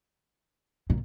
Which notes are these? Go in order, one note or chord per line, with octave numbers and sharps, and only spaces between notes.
A#2